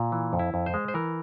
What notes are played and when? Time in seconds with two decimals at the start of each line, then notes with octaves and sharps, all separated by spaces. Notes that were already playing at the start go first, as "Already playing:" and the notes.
Already playing: A#2
0.12 E3
0.33 F2
0.39 E4
0.54 F2
0.66 C5
0.74 G#3
0.88 C5
0.94 E3 A#4